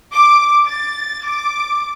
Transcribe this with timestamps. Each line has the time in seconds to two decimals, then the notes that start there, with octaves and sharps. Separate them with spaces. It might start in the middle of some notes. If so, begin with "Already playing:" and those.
0.13 D6
0.68 A6
1.24 D6